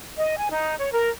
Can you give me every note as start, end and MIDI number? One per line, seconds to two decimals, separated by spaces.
0.18 0.35 75
0.38 0.47 80
0.50 0.76 63
0.79 0.92 73
0.93 1.08 70